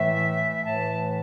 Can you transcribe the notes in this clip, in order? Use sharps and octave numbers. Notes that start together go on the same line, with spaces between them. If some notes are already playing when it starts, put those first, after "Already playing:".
Already playing: A2 E3 A3 E5
A2 E3 A3 A5